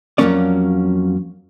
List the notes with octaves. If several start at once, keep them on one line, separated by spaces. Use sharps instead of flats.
F2 C#3 F#3 A#3 C#4 D5